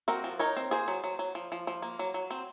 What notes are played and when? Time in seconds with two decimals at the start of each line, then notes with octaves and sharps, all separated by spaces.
0.08 C4 F#4 A#4
0.24 F3
0.39 D#4 A#4 C#5
0.57 C4
0.71 A#3 G#4 C5
0.88 F#3
1.04 F#3
1.19 F#3
1.35 F3
1.52 F3
1.67 F3
1.82 A#3
1.99 F#3
2.14 F#3
2.31 C4